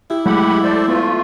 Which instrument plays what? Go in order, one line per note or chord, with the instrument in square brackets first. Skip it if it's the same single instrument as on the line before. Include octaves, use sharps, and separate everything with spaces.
[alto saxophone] E4 [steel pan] G4
[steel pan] F#3 G#3 A3 [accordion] G4 F#5 B5
[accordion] A4 C5 D5
[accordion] A3 F4 [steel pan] B3